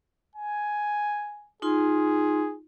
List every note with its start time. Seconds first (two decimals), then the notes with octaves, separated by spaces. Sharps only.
0.35 G#5
1.62 D#4 F4 G#4 C6